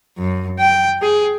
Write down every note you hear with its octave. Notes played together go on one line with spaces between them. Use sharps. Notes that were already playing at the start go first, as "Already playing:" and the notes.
F#2
G5
G#4